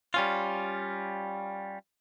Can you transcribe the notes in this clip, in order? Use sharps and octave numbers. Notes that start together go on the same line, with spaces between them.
G3 C#4 F4